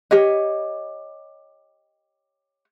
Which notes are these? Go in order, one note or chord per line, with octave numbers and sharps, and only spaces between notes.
G4 C#5 D#5